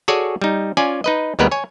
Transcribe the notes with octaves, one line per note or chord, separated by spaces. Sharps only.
F#4 G#4 A4 C#5 D5 G#5
G3 D#4
C#4 F4 D5 G#5
D#4 B4 D#5
D#2 G3 G#3 B3 A#4 B4
C#5 G#5